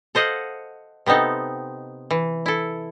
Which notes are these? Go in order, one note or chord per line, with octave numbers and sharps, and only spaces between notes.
A4 C5 D#5 F5 F#5
C3 B3 C4 D#4 A4
E3
E4 A4